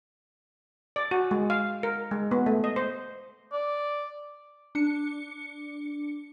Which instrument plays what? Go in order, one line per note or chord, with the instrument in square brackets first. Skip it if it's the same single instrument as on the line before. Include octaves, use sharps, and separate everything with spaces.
[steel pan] D5
F#4
G#3
F5
A#4
G#3
B3
A3
D#5
C5
[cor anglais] D5
[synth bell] D4 C#7